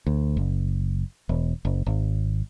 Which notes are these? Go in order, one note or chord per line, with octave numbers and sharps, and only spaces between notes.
D2
F#1
E1
F#1
G#1